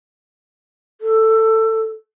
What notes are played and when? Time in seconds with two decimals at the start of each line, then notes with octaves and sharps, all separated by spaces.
1.01 A4